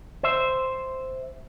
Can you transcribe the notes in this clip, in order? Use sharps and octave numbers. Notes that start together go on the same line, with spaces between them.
C5 E5